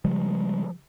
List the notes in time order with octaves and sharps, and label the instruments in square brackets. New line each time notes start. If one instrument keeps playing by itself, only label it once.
[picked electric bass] C#3 F3 G3 G#3